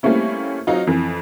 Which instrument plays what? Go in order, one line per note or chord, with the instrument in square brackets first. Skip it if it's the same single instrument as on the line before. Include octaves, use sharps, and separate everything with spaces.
[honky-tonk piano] G3 A3 A#3 C4 C#4 E4
F#3 C4 D#4 F4
F2 E3